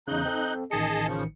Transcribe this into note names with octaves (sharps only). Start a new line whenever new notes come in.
E2 C#3 D#4 F#6 G6
C4 A4
A1 D#3 G#4 D#5 A5 C#7
C#3 F3